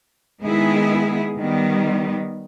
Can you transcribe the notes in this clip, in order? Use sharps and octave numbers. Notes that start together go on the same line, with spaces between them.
D#3 G#3 B3 E4 G#4
D#3 G3 B3